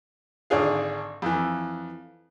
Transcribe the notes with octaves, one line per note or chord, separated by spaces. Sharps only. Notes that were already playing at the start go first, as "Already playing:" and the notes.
G#1 D3 D4 G#4 F5
F2 E3